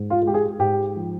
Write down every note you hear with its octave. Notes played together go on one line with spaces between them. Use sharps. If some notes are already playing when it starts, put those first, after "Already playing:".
Already playing: G#2
F4
G#3
G4
G#4
G#2 G4
F3